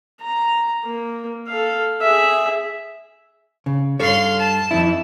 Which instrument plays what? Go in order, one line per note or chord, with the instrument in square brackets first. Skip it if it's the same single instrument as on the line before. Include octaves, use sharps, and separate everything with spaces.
[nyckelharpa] A#5
A#3
A4 F5
G#4 E5
[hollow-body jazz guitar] C#3
[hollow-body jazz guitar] G2 A4 C#5 [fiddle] F5 C6
[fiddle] A5
[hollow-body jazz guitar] F2 D#4 E4